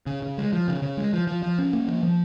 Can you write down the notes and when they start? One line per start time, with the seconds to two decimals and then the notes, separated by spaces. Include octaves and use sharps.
0.07 C#3
0.22 C#3
0.38 G#3
0.53 F3
0.68 C#3
0.82 C#3
0.97 G#3
1.13 F3
1.27 F3
1.43 F3
1.59 C#4
1.73 A#3
1.88 F3
2.03 F3